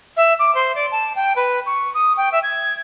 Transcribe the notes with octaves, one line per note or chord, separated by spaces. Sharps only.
E5
D6
C5
D5
A5
G5
B4
C#6
D#6
G5
E5
G#6